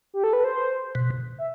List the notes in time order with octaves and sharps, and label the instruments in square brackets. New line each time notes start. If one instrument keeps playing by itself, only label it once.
[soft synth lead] G4
A4
B4
C5
[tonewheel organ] B2
[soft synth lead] E5